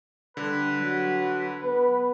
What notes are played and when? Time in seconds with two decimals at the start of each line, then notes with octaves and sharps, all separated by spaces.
0.37 D3 G3 B4
0.78 F#3
1.62 B3 B4